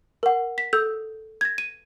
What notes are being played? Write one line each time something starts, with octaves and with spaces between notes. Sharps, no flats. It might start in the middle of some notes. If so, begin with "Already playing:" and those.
A#4 F#5
B6
A4 E6 G6
G#6 A#6
D#7